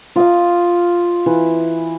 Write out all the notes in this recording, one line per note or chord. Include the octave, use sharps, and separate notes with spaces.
F4 D#5 F5
E3